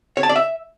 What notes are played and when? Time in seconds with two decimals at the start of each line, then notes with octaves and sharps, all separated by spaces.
0.17 C#5
0.23 A5
0.29 D5
0.36 E5